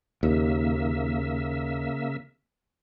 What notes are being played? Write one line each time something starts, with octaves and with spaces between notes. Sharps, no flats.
D#2 C#3 A#3 E5